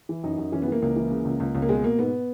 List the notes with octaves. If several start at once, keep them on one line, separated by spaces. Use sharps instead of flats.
E3
F#2 D#4
F#2
E3 C#4
B3
E3 A#3
C#2 A#3
E3
C#3
C#2
C#2
C#2
A#3
B2 G#3
B2 A#3
G#2 B3